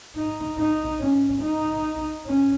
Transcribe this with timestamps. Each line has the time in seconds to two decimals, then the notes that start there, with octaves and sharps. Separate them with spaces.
0.16 D#4
0.58 D#4
1.00 C#4
1.42 D#4
2.26 C#4